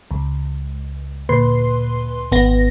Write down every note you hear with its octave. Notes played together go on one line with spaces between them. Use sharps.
C#2
D2 A#2 B4 C6
G#1 B3 A#6